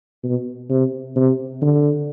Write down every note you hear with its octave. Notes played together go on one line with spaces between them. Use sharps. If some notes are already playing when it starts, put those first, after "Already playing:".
B2
C3
C3
D3